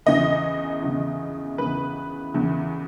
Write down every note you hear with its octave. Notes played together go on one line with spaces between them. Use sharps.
E2 C#3 E3 D#5
E2 C#3 E3
E2 C#3 E3 B4
E2 C#3 E3